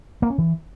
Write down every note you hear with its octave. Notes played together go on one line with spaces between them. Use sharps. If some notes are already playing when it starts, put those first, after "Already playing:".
A#3
C#4
E3